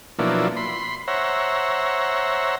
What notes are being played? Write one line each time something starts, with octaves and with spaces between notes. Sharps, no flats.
B2 F3 F#3 A#3 D4 E4
B5 C6
C5 C#5 E5 F#5 A#5